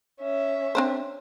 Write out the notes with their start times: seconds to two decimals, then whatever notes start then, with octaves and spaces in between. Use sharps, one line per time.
0.20 C#4 E5
0.75 C4 D4 C5